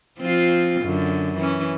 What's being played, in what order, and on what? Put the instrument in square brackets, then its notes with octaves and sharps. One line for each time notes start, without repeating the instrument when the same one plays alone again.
[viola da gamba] F3 C4 F4
F#2 D3
E3 C#4